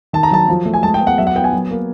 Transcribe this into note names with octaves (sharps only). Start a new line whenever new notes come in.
D#3 A5
A#5
F#3 A5
F3
A3
G#5
G#3 A5
G5
B3
F#5
F#3 E5
F#5
B3 G5
G#5
F#3
A#3